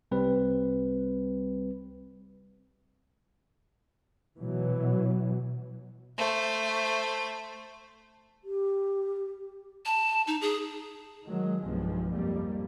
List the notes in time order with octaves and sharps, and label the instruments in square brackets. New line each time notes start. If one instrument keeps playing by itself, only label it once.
[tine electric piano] C2 G3 C4 B4
[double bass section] B2 E3 F#3
[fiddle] A3 C5
[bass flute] G4
[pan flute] A5
D#4
G#4
[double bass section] D#3 F#3 G#3
B1 G2 F3 G#3
F2 G#2 G3 A#3